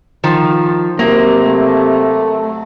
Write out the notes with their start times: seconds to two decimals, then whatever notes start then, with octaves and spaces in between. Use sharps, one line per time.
0.24 D#3 F3
0.99 C3 F#3 A#3
1.44 A3